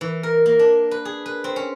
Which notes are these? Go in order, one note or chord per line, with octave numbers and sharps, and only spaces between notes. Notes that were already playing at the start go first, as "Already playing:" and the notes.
E3
A#4
A#3
D4
B4
G#4
B4
C4
C#4